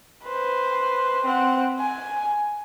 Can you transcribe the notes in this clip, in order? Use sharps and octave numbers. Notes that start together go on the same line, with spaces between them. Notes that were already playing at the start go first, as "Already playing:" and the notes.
B4 C5
C4 F#5
G#5